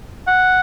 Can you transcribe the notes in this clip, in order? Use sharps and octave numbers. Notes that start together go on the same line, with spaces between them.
F#5